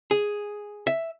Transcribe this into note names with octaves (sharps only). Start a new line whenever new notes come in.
G#4
E5